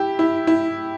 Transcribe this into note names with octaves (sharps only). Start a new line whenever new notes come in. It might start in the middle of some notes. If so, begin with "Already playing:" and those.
Already playing: E4 G4
E4
E4